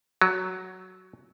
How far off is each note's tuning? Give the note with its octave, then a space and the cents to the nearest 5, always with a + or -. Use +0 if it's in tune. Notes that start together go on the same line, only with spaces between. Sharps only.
F#3 +5